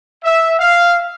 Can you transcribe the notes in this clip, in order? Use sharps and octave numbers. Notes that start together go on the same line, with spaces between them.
E5
F5